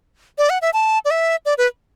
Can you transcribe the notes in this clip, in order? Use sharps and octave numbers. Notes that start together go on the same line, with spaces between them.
D5
F#5
E5
A5
D5
E5
D5
B4